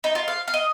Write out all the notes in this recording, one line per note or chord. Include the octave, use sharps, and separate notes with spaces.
D#4
F4
F5
F5
D#5